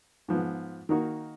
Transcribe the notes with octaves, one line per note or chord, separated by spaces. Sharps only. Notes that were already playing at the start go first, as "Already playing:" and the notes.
G#2 F3 B3
D#3 A#3 D#4 F#4